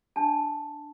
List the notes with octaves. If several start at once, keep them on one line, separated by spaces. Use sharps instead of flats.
D4 A5